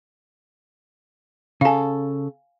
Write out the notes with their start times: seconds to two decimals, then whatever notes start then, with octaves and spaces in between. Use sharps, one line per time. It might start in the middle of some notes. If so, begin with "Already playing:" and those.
1.61 C#3 A4 F5 G#5